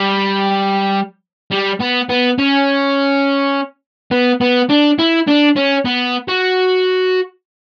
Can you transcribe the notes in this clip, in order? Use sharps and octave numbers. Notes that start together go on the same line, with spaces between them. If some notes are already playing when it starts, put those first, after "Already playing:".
Already playing: G3
G3
B3
B3
C#4
B3
B3
D4
E4
D4
C#4
B3
F#4